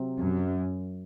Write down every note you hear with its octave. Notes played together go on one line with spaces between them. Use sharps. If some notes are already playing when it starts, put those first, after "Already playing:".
Already playing: C3 F#3 C4
F#2